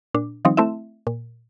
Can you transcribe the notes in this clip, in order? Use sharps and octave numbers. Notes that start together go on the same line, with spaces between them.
A#2 D4
D#3 F3 G3 C4 D#4
A3 C4 E4 E5
A#2